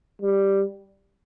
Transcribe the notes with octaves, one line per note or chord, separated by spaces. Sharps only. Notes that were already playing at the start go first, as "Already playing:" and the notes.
G3